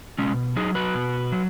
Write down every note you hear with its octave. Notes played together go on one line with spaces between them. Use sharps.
B2 G#3 C#4
F#3 D#4 G#4
F#4 B4
B2
F#3